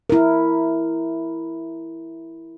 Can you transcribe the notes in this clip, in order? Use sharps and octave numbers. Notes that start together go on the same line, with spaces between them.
E4 A#4